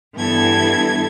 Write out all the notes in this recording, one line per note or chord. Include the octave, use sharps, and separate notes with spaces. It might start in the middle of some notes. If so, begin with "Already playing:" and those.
G2 E3 B3 A4 G#6